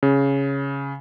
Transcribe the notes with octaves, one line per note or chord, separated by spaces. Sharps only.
C#3